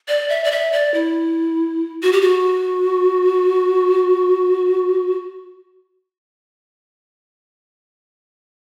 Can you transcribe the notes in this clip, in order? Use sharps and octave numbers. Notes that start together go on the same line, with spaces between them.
D5
E5
D5
E5
D5
E4
F#4
G4
F#4